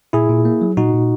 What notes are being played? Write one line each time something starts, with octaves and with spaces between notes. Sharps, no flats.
A#2 E4 G#4
A#2
A#3
F#3
A#2 D#4 F#4
A#2